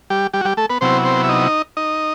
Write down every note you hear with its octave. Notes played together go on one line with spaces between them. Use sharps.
G3 G4
G3 G4
F#4
G3 G4
A3 A4
B3 B4
C3 F#3 B3 C4 E4 C5
C4 C5
E5
D#4 D#5
D#4 D#5